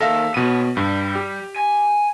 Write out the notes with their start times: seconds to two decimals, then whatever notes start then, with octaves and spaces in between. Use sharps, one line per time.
0.01 D#2 A4 A#4 E5 F5
0.34 B2 B3 C#5 D#7
0.77 G2 G3
1.15 G4
1.56 G#5